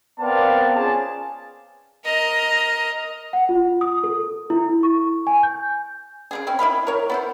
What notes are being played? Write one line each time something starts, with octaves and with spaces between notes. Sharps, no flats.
B3 C4 A#4 D5 F5 A5
C#4 F4 G#4 G#5 A5
A#4 D#5
F#5
F4
D#6
A4
E4
C#6
G#5
G6
C#3 F3 G#4
C4 C#4 E4
E4 D#5 F5 B5
A#4 C#5
B3 E4 C5